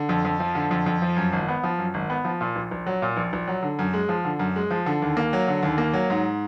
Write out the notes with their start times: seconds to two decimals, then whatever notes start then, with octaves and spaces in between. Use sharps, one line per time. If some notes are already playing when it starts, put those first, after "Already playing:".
Already playing: D3
0.09 F2
0.25 F2
0.40 F3
0.55 D3
0.71 F2
0.86 F2
1.02 F3
1.16 F#2
1.33 G#1
1.48 B3
1.63 F3
1.78 F#2
1.94 G#1
2.10 B3
2.24 F3
2.41 A#2
2.56 A#1
2.71 A#1
2.86 F#3
3.02 A#2
3.17 A#1
3.33 A#1
3.48 F#3
3.63 D3
3.79 F#2
3.94 G#3
4.09 F3
4.25 D3
4.39 F#2
4.56 G#3
4.70 F3
4.86 D3
5.02 D#2
5.17 A#3
5.33 F#3
5.48 D3
5.63 D#2
5.78 A#3
5.93 F#3
6.10 G#2